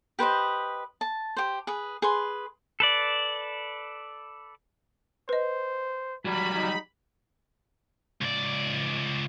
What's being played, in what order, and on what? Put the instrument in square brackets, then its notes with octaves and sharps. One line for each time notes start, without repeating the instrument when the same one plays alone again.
[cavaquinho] G4 B4 C5 D#5
A5
G4 C5
G#4 B4
G#4 B4 C6
[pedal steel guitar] A4 B4 D5
[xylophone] B4 D#5 [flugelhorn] C5
[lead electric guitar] F#3 G3 [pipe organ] B5
[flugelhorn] D#4
[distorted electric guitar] C#2 D5